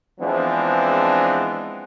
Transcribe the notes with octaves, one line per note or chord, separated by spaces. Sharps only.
E3 F3 G#3 B3 C4 D4